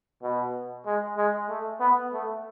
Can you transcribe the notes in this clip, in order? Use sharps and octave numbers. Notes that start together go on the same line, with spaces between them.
B2
G#3
G#3
A3
B3
A3